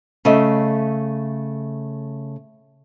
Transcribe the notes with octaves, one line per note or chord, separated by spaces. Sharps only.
C#3 A3 D#5 E5